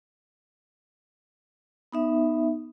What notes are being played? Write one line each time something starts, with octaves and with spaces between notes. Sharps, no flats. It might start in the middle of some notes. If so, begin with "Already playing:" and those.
B3 D#4 E5